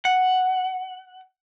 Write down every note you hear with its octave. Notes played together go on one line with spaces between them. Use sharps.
F#5